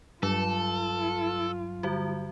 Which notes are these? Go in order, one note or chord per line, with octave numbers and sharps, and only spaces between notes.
G2 F#3 F4 A4
D3 G3 F#4